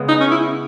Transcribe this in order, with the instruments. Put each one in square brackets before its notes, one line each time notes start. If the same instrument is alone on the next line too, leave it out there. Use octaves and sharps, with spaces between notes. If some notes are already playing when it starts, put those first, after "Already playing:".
Already playing: [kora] C#3 G#3 B3
[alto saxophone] D#4
C#4
E4